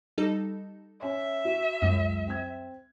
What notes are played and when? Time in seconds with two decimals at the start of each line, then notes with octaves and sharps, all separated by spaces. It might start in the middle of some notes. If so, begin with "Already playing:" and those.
0.18 G3 D#4 A4
1.02 C#4 E5
1.45 F#4
1.82 C#2 F#2
2.27 C4 G#6